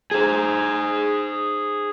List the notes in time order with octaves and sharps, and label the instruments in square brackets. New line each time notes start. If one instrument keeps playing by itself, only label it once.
[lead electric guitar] G#4 C5